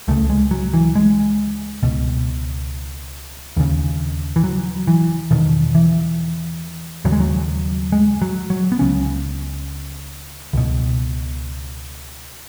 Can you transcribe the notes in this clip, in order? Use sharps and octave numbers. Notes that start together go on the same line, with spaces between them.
C#2 C#3 A3
G#3
F#3
E3
G#3
C#2 B2
D#2 C#3
E3
F#3
E3
E2 B2 D#3
E3
D#2 C#3 F#3
G#3
F#3
G#3
F#3
F#3
B3
C#2 C#3 C#4
C#2 B2